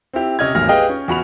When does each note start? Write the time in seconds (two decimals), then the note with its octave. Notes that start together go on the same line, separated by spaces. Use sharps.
0.13 C4 E4 G4
0.39 C3 C#4 D#5 F6 G#6
0.55 G#1 E2 A2 F#3 F6 A#6
0.68 G4 G#4 B4 D#5 F5 G5
0.89 C#4
1.08 E2 F#4 B5 F7